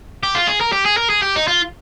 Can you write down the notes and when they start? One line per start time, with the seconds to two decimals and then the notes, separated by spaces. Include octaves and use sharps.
0.23 G4
0.35 F4
0.47 G#4
0.61 A#4
0.73 G4
0.85 G#4
0.97 A#4
1.10 G#4
1.22 G4
1.36 D#4
1.48 F4